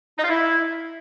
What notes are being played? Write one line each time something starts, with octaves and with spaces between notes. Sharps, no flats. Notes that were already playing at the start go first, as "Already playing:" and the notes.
D#4
F4
E4